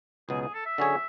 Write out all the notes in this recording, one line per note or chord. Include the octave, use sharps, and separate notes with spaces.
C#2 B2 F#3 G#4
G#4
A4
E5
D3 F#3 C#4 G#4 C#5